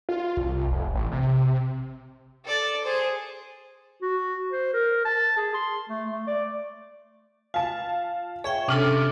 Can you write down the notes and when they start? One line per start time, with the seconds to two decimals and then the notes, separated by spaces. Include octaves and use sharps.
0.09 F4
0.37 C2
0.71 F1
0.94 A1
1.12 C3
2.45 A4 D5
2.84 G#4 C5
4.02 F#4
4.52 C5
4.74 A#4
5.05 A5
5.37 G#4
5.54 C6
5.89 A3
6.11 A3
6.27 D5
7.54 F4 F5 A5
8.44 G#4 C#5 E5 G5
8.68 C3 C#4 D4 A4 D6 F6